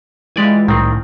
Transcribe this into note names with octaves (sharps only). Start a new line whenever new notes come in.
E3 G#3 F4 G4 D5 G#5
C2 A2 D#3 C4